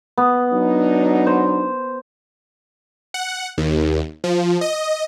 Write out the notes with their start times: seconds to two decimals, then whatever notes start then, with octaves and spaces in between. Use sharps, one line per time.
0.18 B3
0.52 F#3 D4 D#4
1.27 C5
3.14 F#5
3.58 D#2
4.24 F3
4.61 D#5